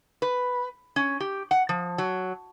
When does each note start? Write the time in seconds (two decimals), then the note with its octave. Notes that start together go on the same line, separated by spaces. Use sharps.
0.22 B4
0.96 C#4
1.20 G4
1.51 F#5
1.69 F3
1.98 F#3